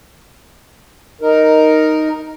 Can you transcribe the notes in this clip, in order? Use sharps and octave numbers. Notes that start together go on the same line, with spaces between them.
D#4 A#4